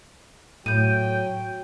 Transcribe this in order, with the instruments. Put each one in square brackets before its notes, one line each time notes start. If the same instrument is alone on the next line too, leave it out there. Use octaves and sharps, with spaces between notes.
[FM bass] A2 [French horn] F#3 [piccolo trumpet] G5 [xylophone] G6 D#7